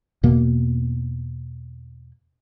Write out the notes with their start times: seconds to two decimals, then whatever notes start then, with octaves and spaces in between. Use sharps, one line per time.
0.23 E2 B2 A#3